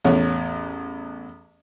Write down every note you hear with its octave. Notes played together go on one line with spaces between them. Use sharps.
A1 E2 C#5